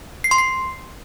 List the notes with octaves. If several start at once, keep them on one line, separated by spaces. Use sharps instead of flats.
C7
C6
C7